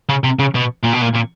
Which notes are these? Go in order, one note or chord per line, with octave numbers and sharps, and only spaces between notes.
C#3
C3
C#3
B2
A#2
B2
A#2
A#2